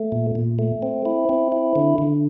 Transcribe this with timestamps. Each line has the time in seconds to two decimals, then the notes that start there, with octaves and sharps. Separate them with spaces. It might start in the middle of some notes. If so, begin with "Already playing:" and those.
Already playing: A3
0.12 A#2
0.35 A#2
0.59 A3
0.82 C4
1.05 E4
1.29 C4
1.52 E4
1.76 D3
1.98 D3